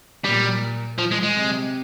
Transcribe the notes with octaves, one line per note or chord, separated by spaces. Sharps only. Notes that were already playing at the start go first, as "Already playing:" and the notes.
A#2 G3
F3
G#3
G#3
C3